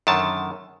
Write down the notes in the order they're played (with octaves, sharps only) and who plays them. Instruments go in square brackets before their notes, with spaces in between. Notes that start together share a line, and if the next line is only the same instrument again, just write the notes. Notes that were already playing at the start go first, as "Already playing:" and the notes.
[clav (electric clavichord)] F#2 D3 D#3 A5